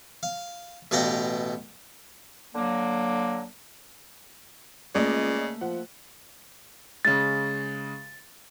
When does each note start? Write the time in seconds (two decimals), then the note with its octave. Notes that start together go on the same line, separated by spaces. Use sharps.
0.23 F5
0.91 A1 B2 D5 F5 G5 A#5
2.54 D3 F#3 A#3
4.95 C#2 C#3 A3 A#3 D5 D#5
5.61 F3 F#5
7.05 C#3 G#3 A6